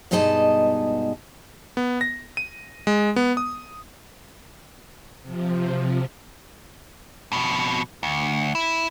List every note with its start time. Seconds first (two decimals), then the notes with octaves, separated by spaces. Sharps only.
0.11 G2 B2 G#3 D#4 D#5 A5
1.77 B3
2.01 A#6
2.37 D#7
2.87 G#3
3.16 B3
3.37 D#6
5.22 C3 F3
7.32 F2 B2
8.03 D2
8.55 E4